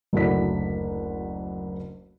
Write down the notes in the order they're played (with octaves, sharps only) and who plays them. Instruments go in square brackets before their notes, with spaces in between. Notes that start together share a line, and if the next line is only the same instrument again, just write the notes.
[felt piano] F#1 D2 E4 F#4 D5 B6